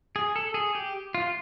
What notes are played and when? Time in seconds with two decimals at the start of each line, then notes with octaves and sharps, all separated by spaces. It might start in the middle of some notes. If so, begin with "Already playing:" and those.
0.16 G#4
0.36 A4
0.54 G#4
0.75 G4
1.15 F4